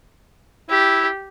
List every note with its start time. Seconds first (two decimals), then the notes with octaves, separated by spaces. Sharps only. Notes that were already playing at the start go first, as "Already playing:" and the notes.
0.70 E4 G4